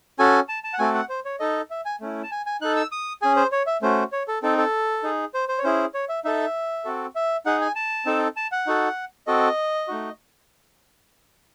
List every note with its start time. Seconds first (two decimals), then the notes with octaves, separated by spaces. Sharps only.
0.19 C#4 F#4 A4 G#5
0.49 A5
0.64 A5
0.73 F#5
0.79 A3 C4 F#4 A4 G#5
0.94 F#5
1.09 C5
1.25 C#5
1.40 D#4 A4 D#5
1.70 E5
1.85 G#5
2.01 A3 C#4 E4
2.23 A5
2.31 G#5
2.46 G#5
2.61 D#4 A4 F#6
2.76 E6
2.92 D#6
3.22 C#4 G#4 G#5
3.36 C5
3.52 C#5
3.67 E5
3.82 A3 C#4 F#4 C5
4.12 C#5
4.28 A4
4.43 C4 D#4 A4
4.58 A4
5.03 D#4 G#4
5.34 C5
5.49 C5
5.59 C#5
5.64 C#4 E4 G#4 C5
5.94 C#5
6.09 E5
6.25 D#4 A4 E5
6.85 C4 F#4 A4
7.15 E5
7.46 D#4 G#4 F#5
7.61 G#5
7.75 A5
8.06 C4 D#4 A4
8.37 A5
8.52 F#5
8.67 D#4 F#4 A4
9.27 C4 F#4 A4 D#5
9.88 A3 D#4 F#4